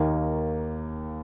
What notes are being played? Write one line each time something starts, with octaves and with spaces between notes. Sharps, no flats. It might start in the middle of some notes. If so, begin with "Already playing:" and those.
Already playing: D#2 D#3 A#3